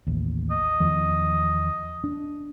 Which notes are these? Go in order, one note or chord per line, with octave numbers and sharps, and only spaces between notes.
A1 D#2
D#5
E2 D#3 F3
D4